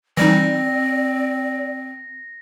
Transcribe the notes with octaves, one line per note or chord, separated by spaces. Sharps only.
E3 G3 C4 D#4 D5 A#6